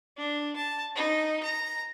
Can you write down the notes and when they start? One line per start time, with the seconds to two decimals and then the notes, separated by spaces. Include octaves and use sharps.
0.17 D4
0.56 A5
0.95 D#4
1.43 A#5